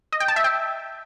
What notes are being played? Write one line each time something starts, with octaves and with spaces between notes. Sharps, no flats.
D#5
G5
A5
E5
G5